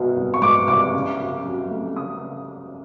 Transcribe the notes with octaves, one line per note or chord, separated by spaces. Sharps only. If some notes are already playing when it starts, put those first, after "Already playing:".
Already playing: C2 B2 G#3
C2
C#6
G#3 D6
C2 D6
C#3
F#2
F#3
A3
C#3 D#6